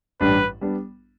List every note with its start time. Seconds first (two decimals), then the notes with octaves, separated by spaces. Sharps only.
0.21 A1 G2 G3 D4 B4
0.61 G3 B3 D4